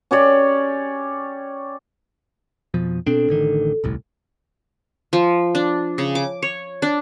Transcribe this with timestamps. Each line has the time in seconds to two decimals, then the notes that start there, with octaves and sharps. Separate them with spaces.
0.11 C#4 G4 C#5 D5
2.74 F2 B2 F3
3.07 B2 C4 D4 A4
3.29 A1 D3 D#3
3.84 D#1 C2 A2
5.13 F3
5.55 D4
5.98 C#3
6.15 D6
6.42 C#5
6.82 D4